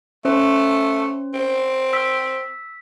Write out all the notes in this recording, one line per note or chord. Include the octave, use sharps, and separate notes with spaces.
A3 C#4 C5
C4
E6 B6